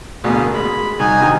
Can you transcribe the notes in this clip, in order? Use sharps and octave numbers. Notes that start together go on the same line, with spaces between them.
A1 D2 B2 A#3 G#4
G#3 B5
C2 D#4 G#5
C3 D#3